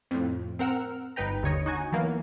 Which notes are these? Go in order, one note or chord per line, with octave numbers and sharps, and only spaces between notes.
F2 A2
C4 A#4 F#5 E6 F6
G1 D#4 B4 G5 A#5
D#2 D3 C#5 D#5 C#7
D#4 F#4 G#5
E3 F#3 A#3 B3